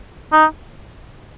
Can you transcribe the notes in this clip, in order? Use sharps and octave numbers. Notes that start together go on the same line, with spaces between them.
D#4